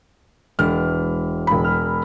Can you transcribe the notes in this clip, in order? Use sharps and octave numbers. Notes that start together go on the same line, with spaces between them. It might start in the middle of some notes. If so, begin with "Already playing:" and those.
E1 F6
E1 B5
F6